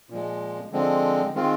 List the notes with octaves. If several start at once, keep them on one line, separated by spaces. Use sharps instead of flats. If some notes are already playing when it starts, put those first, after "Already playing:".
A#2 F3 G#3
D3 F3 G#3 C4
D#3 G#3 C4 F4